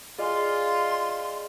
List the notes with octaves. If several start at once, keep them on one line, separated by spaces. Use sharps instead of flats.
F4 G#4 D5 D#5 G#5 C6